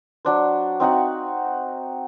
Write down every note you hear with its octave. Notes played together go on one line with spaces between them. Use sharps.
F#3 D4 C5
C4 D#4 F#4 F#5